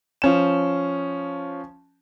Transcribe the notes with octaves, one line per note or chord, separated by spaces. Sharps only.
F3 C#4 E7